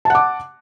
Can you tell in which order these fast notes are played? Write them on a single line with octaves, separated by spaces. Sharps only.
A5 F#5 D6